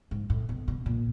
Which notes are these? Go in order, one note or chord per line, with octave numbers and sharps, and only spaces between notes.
G#2
A2
B2
B2
A#2